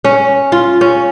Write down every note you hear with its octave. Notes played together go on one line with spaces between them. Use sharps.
C#4
F4
C#4